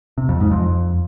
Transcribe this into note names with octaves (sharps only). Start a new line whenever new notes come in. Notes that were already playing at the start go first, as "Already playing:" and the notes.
C3
F2
G#2
F2